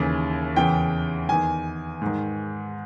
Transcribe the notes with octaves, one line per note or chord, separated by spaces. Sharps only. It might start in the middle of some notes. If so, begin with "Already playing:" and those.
Already playing: D#2 C#3 E3
E2 C#3 E3 G5
E2 D#3 G#5
G#2 D#3